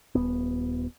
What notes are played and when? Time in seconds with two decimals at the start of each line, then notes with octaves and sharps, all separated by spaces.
0.15 D#1 B3